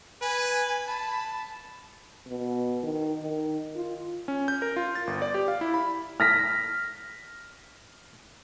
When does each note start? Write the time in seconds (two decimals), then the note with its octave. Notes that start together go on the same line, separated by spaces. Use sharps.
0.22 B4 G#5
0.87 A5 B5
2.27 B2
2.83 D#3
3.22 D#3
3.76 F4
4.28 C#4
4.48 G6
4.62 A#4
4.76 F4
4.95 A6
5.07 G1
5.22 D5
5.34 G4
5.48 F5
5.61 E4
5.74 B5
6.20 F6 A#6 B6